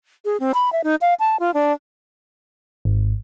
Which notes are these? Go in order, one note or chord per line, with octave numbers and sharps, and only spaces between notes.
G#4
C4
B5
E5
D#4
F5
A5
F4
D4
G#1